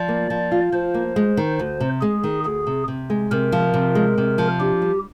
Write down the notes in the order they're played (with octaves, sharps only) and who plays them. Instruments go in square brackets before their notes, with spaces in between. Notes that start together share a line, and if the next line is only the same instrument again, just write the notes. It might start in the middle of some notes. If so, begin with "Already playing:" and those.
Already playing: [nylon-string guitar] F3 [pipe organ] D5
[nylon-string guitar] A#3
F3
F4
[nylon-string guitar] F3 [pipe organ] C5
[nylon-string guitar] A#3
G#3
D#3
D2
C3
[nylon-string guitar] G#3 [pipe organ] G#4
[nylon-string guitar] D#3
[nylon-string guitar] D2 [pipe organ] G#4
[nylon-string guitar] C3
C3
G#3
[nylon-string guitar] C3 [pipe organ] A#4
[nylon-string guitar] F3
C3
G#3
C3
F3
[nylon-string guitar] D4 [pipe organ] G4
[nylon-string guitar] G3